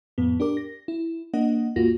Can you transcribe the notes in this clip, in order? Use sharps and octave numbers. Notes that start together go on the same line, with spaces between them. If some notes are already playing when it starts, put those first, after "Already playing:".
F2 A2 B3
D4 G4 A#4 D6
A#6
E4
A#3 D4 D#5 F#5
D#2 G#2 A#3 F4 F#4 A#6